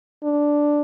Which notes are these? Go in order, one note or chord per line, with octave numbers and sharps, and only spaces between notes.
D4